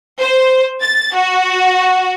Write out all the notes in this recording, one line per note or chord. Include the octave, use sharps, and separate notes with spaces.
C5
A6
F#4